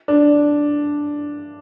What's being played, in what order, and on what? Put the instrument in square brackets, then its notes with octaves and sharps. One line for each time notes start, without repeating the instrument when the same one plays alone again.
[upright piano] D4